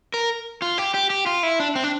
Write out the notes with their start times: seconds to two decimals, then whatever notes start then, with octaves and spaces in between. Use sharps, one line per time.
0.14 A#4
0.62 F4
0.78 G4
0.94 G4
1.10 G4
1.26 F4
1.43 E4
1.60 D4
1.75 C4
1.84 D4